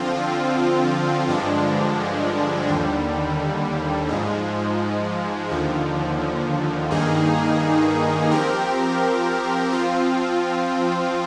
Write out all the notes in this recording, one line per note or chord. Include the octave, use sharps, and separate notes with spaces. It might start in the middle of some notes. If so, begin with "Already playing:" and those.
Already playing: D3 F3 C4 F4
G2 D3 F3 G#3 D4
D#2 D3 G3
G#2 F3 G#3
D#2 D3 F3
G2 D#3 A#3 D#4 G#4
F3 C4 G4 A#4
F3 C4 F4